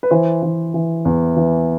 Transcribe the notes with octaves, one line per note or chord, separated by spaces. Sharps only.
B4
E3 C5
E3
E3
E2
E3